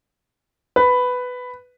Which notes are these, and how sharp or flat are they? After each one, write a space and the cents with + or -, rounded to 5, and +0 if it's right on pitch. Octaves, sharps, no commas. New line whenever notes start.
B4 +10